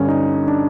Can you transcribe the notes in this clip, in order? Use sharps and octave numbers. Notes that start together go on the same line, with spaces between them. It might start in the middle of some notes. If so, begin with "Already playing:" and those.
Already playing: G2 D3 C#4
D#4
D4